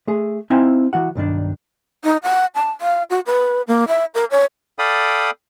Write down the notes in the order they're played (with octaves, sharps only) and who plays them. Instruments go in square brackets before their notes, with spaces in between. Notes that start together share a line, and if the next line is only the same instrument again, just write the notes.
[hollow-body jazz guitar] A3 G#4
C4 D#4 E4 F5 G5 G#5
E3 F#4 F#5
B1 G2 D#3 D4
[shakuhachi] D#4
F#5
A5
F5
F#4
B4
A#3
E5
A#4
C#5
[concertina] A4 D5 F5 G5 B5 D#6